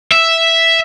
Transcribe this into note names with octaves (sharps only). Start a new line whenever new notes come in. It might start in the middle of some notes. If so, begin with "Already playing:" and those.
E5